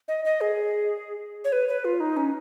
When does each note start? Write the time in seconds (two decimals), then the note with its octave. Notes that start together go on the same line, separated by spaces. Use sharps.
0.08 D#5
0.25 D#5
0.41 G#4
1.44 C#5
1.52 B4
1.69 B4
1.85 F4
2.00 D#4
2.17 C#4